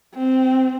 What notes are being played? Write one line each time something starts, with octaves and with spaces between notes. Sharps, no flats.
C4